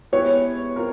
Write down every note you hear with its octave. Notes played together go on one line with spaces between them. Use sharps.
G#3 B3 E4 G4 B4 C#5
C4 F4 A#4